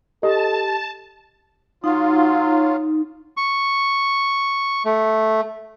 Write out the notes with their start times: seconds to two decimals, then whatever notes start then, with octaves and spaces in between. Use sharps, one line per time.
0.23 G4 A4 D#5 A5
1.84 F#3 D#4 F4
3.37 C#6
4.85 A3